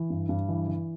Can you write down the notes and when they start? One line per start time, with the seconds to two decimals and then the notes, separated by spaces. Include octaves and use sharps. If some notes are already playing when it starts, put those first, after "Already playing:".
Already playing: E3
0.10 G2
0.29 G2
0.49 E3
0.68 E3